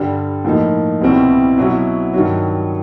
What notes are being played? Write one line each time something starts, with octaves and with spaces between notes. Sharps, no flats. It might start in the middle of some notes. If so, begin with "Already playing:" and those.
Already playing: G2 D3 G3
A2 F3 A#3 D#4
C2 B2 G3 C4 E4
B2 F#3 B3 E4
G2 D#3 F#3